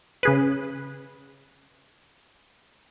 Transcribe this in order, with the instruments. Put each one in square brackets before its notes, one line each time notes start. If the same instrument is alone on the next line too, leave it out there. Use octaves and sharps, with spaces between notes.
[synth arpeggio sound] C#3 G#4 B4